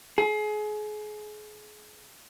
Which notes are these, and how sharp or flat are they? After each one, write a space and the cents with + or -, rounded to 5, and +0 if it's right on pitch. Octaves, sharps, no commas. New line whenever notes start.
G#4 +30